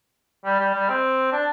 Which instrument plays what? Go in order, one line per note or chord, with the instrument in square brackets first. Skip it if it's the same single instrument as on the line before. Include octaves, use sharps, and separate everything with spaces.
[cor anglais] G3
G3
G3
C4
D4